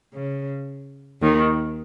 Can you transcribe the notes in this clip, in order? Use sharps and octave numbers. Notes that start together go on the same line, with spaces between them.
C#3
D#2 D#3